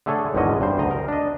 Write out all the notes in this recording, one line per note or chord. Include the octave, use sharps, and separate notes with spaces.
D3 A3 G#4 A4 C#5
G#1 E2 G#2 D3 C#4 D#5
G2 C5
D2 D#5 A#5
A#4
D4 D#5